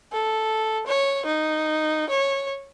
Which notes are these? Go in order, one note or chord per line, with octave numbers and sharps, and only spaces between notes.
A4
C#5
D#4
C#5